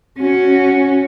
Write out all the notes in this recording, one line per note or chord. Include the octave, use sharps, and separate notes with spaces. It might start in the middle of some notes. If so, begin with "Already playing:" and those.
C#4 F#4